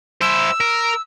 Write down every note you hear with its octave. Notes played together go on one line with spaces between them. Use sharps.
E4 C5 E6
A#4